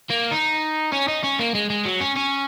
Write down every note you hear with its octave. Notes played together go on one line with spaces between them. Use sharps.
A#3
D#4
C#4
D#4
C#4
A#3
G#3
G#3
F#3
C#4
C#4